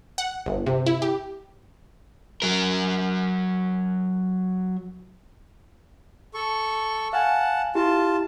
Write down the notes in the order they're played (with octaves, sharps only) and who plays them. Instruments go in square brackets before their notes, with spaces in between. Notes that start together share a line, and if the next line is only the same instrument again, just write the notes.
[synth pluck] F#5
G1
C3
E4
G4
[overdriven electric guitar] F#3 A#4
[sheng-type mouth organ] A4 C#6
[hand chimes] F5 G#5 [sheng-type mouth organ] F#5 A5
[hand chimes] E4 G4 [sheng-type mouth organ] F4 A5